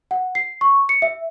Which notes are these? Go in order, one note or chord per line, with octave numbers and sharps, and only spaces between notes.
F#5
C7
C#6
C#7
E5